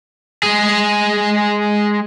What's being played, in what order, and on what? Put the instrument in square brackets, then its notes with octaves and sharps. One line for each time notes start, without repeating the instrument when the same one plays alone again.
[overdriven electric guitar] G#3 G#4